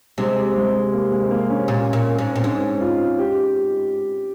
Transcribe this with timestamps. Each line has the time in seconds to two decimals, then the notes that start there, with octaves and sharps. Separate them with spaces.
0.18 C3 G#3
0.56 G#3
0.93 A#3
1.12 G#3
1.23 C4
1.31 A#3
1.50 C#4
1.68 A#2
1.93 A#2
2.18 G#2
2.33 A#2 C4
2.43 G#2 C#4
2.81 F4
3.19 G4